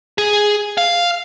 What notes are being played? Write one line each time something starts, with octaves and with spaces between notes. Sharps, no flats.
G#4
F5